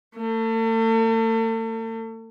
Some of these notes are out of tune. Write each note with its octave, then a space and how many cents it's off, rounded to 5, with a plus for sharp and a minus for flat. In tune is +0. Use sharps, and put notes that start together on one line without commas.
A3 +40